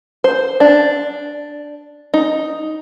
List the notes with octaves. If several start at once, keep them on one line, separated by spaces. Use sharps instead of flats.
C5
D4
D#4